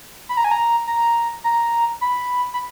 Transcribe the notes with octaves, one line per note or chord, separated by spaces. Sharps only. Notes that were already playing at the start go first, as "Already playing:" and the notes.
B5
A#5
G#5
A#5
A#5
A#5
B5
B5